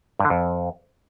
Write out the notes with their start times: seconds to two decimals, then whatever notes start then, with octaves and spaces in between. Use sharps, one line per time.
0.20 G2
0.25 D3
0.30 F2